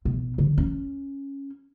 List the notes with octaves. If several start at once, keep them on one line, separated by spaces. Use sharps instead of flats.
B1
D3
C#4